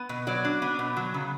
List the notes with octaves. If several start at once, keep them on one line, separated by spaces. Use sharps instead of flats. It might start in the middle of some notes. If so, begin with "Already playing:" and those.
Already playing: B3
B2
F#3 D5
D4
B3
B2
F#3
C#3